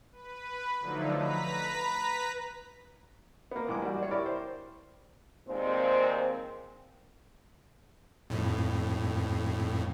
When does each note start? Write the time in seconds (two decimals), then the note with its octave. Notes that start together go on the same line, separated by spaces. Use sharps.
0.12 B4
0.80 D3 F3 F#3 A3 D4 D#4
1.17 B4 A#5 B6
3.51 A#3 B3
3.68 C2 E3 G#3 D6
3.82 G3 F#4
3.98 D4 C#5
4.11 E4 G4 A#4 D5 B5 C#6
4.26 C5
5.47 D#2 A#2 G#3 C4
8.30 F2 A2